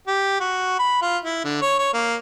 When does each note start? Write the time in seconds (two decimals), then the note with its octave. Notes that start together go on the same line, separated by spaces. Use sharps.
0.07 G4
0.40 F#4
0.79 B5
1.02 F4
1.25 E4
1.44 D3
1.62 C#5
1.78 C#5
1.94 A#3